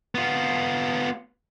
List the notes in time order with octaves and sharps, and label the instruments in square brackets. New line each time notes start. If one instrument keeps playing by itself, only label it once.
[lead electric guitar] B3 F4